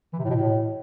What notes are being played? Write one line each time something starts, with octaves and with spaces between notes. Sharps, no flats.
E3
C3
A2
B2
A2